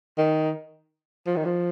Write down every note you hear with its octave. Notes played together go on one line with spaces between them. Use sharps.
D#3
F3
D#3
F3